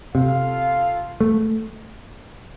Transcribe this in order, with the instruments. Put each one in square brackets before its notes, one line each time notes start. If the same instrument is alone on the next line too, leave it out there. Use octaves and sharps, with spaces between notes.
[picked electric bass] C3 [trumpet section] F4 A4 F5
[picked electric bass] A3